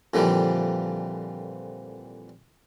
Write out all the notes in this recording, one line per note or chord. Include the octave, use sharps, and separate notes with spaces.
F2 A#2 D3 E3 F3 G3